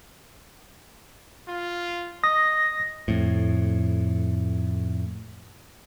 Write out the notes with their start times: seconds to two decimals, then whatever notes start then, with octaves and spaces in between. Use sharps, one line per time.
1.48 F4
2.24 D#5 D#6 A#6
3.08 F2 A2